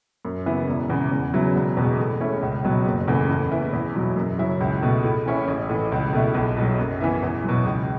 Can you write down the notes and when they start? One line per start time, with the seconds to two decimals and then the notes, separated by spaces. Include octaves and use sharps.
0.25 F#2
0.46 C#3 E3 B3 E4
0.68 E1
0.90 E2 C#3
1.12 E2
1.33 C#3 F#3 B3 E4
1.55 E1
1.77 E2 B2
1.98 A2
2.20 A3 C#4 E4
2.43 C#2
2.64 B2 F#3
2.86 F#1
3.08 E2 C#3 E3 A3
3.29 A2
3.52 E3 B3 E4
3.73 E2
3.95 B2 F#3
4.16 F#2
4.38 C#3 F#3 C#4 E4
4.61 C#2
4.82 B2 A3
5.04 A2
5.26 E3 C#4 E4
5.48 A1
5.69 A2 E3
5.92 C#2
6.13 B2 A3 E4
6.34 B1
6.57 B2 F#3
6.79 F#2
7.00 E3 B3 E4
7.23 E2
7.44 B2 F#3
7.66 C#2